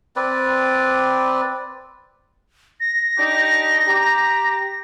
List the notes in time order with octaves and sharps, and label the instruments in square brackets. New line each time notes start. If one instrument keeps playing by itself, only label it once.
[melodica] C4 B4 D5
[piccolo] A#6
[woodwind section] D4 D#4 G4
G4 A#5